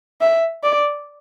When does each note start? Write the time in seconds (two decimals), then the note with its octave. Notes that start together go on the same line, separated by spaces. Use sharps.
0.21 E5
0.63 D5